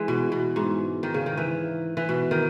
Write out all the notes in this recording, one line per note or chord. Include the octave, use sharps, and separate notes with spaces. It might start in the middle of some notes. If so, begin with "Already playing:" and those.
Already playing: E3 G#3
B2
B2
G#2
D#3
C#3
D#3
E3
E3
B2
D#3